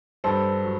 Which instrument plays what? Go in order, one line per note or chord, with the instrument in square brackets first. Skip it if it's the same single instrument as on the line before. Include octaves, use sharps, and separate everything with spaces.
[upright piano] G2 A4 C5
F#3